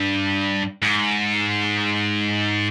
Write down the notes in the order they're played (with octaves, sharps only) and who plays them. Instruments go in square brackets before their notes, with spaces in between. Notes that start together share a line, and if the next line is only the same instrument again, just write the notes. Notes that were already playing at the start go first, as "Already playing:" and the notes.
Already playing: [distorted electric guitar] G2
G#2